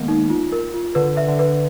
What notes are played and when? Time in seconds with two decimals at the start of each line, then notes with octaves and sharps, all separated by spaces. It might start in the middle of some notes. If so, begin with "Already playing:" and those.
Already playing: D#3 G#3 A#3 B3
0.08 D#4
0.30 F4
0.52 A#4
0.74 F4
0.95 D3 B4
1.17 E5
1.28 D3
1.39 B4